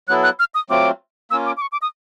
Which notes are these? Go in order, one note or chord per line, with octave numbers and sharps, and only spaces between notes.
F#3 B3 E4 A4 F#6
F#6
F6
D#6
F#3 A3 C4 F4 D6
A#3 C#4 F4 E6
D6
D6
C#6
D6
D#6